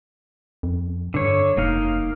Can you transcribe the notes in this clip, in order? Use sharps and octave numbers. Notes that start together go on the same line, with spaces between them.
F2
G2 D3 C#5
F1 A#3 D#4 F5